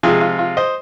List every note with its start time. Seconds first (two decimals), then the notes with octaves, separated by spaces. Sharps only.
0.03 C3 F3 G#3 F4 G#4
0.21 F4
0.39 F4
0.57 C5 D#5